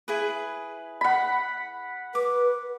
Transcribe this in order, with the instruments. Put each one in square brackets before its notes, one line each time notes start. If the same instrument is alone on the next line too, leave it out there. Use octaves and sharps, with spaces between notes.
[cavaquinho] E4 G#4 B4
[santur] F#5 B5
[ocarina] B4 [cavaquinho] D6